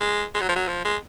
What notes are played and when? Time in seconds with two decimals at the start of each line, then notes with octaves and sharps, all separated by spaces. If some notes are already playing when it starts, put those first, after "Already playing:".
0.01 G#3
0.35 G#3
0.41 F#3
0.49 F3
0.56 F#3
0.68 F3
0.85 G#3